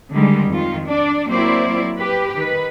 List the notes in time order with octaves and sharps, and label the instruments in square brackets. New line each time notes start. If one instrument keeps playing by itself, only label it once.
[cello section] D3 D#3 G3 G#3
F2 D#3 F4
D4 D5
F#3 A#3 C4 E4 C5 D5
G4 B4
D#3 B4